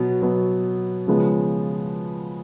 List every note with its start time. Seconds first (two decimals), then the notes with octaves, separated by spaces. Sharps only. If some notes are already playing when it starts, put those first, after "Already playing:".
Already playing: B2 F#3 B3
0.22 B2 F#3 B3
1.07 C#3 F3 G#3 B3